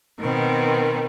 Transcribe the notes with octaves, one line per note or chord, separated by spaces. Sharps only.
B2 D#3 B3 C4